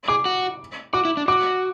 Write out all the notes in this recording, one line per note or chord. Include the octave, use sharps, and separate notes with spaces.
G#4 D6
F#4
F#4 D6
E4
D4
F#4 D6